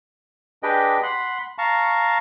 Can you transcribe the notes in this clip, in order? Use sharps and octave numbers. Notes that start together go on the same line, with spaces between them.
D4 G4 G#4 B4 D#5 G5
F#5 B5 C6
F5 A5 A#5 C#6